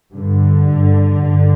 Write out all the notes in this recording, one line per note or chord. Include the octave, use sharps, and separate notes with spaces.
G2 D3
G2
G2